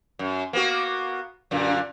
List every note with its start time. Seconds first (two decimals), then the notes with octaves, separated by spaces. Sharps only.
0.19 F#2
0.53 A#3 B3 F#4
1.51 F#2 A#2 D3